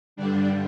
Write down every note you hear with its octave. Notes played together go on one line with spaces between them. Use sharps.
G2 D3 G3 D4